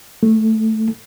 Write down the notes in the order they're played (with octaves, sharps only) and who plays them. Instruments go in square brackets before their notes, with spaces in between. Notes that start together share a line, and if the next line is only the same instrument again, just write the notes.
[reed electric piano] A3